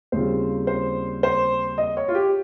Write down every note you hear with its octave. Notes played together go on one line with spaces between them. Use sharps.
D#2 C#3 G3 C4 F4 C5
C5
C5
D#5
C#5
F4
G4